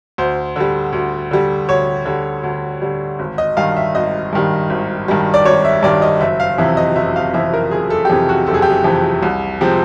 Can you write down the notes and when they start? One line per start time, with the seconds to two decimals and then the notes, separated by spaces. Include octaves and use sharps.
0.18 D2 C5
0.56 D3 G3
0.93 D2
1.31 D3 G3
1.69 D2 C#5
2.06 D3 G3
2.43 D2
2.82 D3 G3
3.19 G#1
3.38 D#5
3.57 G2 D#3 G3 F5
3.76 E5
3.95 G#1 D#5
4.33 G2 D#3 G3
4.70 G#1
5.08 G2 D#3 G3
5.34 D5
5.45 G#1 C#5
5.65 E5
5.83 G2 D#3 G3 D5
6.02 D#5
6.21 F#1 E5
6.40 F5
6.58 F2 C3 E3 E5
6.77 D#5
6.96 F#1 E5
7.16 F5
7.34 F2 C3 E3 E5
7.53 A#4
7.71 F#1 G#4
7.90 A4
8.05 G4
8.10 F2 C3 E3 G#4
8.29 F#4
8.47 F#1 A4
8.54 G#4
8.62 G4
8.70 G#4
8.84 F2 C3 E3
9.23 C2
9.61 C3 F3 G#3 C4